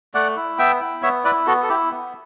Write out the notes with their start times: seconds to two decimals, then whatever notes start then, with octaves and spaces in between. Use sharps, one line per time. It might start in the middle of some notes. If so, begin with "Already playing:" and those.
0.14 A3 D5 F#5
0.37 E4
0.58 B3 E5 G5
0.81 E4
1.02 B3 C#5 E5
1.25 E4 B4 D5
1.47 B3 F#4 A4
1.63 A4
1.69 E4 G4
1.91 B3